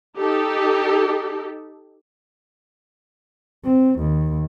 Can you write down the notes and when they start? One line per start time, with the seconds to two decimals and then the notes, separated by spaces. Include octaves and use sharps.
0.18 D#4 G4 A4
3.64 C4
4.00 D#2